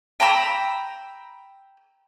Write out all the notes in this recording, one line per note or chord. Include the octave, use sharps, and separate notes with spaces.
G5 A#5 B5 E6